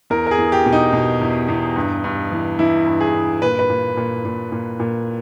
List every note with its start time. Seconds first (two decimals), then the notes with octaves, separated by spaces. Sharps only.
0.10 E2 A#4
0.27 A#4
0.31 G#4
0.38 E2
0.52 G4
0.66 B2
0.72 D#4
0.93 B2
1.21 E2
1.49 E2
1.76 G2
2.04 G2
2.32 E3
2.59 E3 E4
2.87 G2
3.00 G#4
3.14 G2
3.42 A#2 B4
3.59 B4
3.70 A#2
3.97 A#2
4.25 A#2
4.52 A#2
4.80 A#2